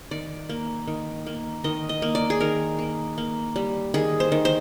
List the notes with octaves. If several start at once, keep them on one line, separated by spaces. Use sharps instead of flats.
D#3 D5
A#3
D#3
A#3
D#3 D#5
D#5
A#3
D5
G#4
D#3 A#4
A#3
A#3
G3
D#3 G#4
C5
D#3
C5